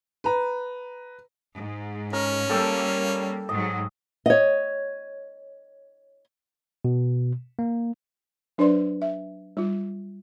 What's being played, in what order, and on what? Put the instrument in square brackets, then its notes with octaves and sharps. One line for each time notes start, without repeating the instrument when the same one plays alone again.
[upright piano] B4 A#5
[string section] G#2
[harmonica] C#4 [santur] A#4
[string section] G3 A#3 [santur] A4 G5 E6
[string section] G#2 F#3 [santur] D#5
[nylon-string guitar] C#5 D#5
[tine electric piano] B2
A#3
[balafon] F#3 D4 B4 C5 D5 C6
E5
G3 F4